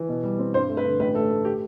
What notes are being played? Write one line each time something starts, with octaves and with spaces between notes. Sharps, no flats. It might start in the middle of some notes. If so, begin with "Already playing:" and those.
Already playing: E3
B2
G3
C4
G2 C5
A3
B4
D3
A1 B4
A3 A4
A3
G4